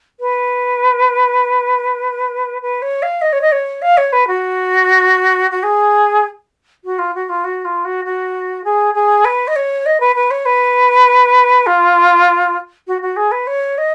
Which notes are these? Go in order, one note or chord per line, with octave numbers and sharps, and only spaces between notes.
B4
B4
C#5
F5
D#5
C#5
D#5
C#5
F5
C#5
B4
F#4
F#4
G#4
F#4
F4
F#4
F4
F#4
F4
F#4
F#4
G#4
G#4
B4
D#5
C#5
D#5
B4
B4
C#5
B4
F4
F#4
F#4
G#4
B4
C#5
D#5